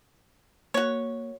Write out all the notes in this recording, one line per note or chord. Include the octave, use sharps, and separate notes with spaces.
A#3 F#4 C#5